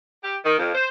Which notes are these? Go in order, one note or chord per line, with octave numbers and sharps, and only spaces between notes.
G4
D#3
F2
C5